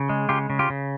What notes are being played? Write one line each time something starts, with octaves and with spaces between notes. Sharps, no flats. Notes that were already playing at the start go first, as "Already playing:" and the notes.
Already playing: C#3
G#3
C#3 F4 G4
C#3
F4 G4
C#3